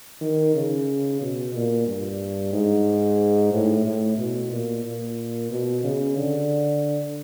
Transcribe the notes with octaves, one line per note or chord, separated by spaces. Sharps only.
D#3
C#3
B2
A#2
G2
G#2
A2
A2
B2
A#2
A#2
B2
C#3
D3